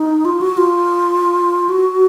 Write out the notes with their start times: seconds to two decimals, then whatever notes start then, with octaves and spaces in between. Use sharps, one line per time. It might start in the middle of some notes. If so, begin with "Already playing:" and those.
Already playing: D#4
0.25 F4
0.41 F#4
0.57 F4
1.69 F#4